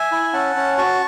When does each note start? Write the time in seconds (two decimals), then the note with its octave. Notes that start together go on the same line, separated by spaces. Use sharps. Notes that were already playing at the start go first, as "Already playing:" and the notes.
Already playing: E5 G#5
0.12 E4
0.33 C#4 F#5 A5
0.56 C#4
0.78 F#4 A5 C#6